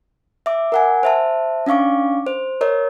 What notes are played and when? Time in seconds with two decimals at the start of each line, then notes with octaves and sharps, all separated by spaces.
0.46 E5 D6
0.72 A#4 F#5 G#5
1.03 C5 E5 A5
1.66 C#4 D4 F5 C#6 D6
2.27 C5
2.61 A#4 C#5 D#5